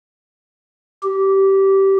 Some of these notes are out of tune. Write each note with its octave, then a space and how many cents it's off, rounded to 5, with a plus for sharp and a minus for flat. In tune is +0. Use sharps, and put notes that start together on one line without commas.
G4 -15